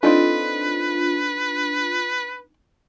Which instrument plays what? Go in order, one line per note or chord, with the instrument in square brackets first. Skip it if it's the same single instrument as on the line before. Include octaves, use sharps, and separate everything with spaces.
[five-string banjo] C4 D#4 A4 [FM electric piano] D4 F4 [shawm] B4